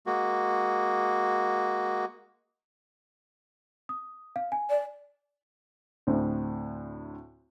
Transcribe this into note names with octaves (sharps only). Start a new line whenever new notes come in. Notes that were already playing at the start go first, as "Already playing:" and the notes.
G#3 A#3 F#4
D#6
F5
G#5
D5
D2 A2 C4